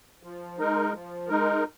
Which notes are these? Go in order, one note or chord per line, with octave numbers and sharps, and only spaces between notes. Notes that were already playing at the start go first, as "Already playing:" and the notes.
F3
G#3 D#4 A#4
F3
G#3 D#4 A#4